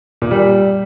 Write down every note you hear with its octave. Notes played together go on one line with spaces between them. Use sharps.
A#2
G3